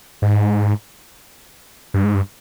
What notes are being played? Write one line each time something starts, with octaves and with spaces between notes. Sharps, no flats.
G#2
G2
G#2
G2